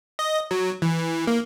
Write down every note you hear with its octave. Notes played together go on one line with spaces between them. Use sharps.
D#5
F#3
E3
A#3